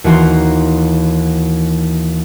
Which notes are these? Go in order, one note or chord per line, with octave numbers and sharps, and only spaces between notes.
D#2 E3 F#4 A#5 C6